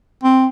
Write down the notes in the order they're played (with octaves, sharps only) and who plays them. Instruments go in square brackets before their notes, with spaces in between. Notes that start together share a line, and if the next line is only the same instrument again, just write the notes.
[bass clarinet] C4